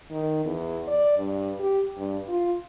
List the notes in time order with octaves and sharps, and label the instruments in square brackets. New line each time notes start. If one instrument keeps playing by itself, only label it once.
[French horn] D#3
E2
D5
G2
G4
G2
F4